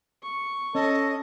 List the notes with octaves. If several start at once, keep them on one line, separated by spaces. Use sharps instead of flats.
C#6
C#4 A4 D#5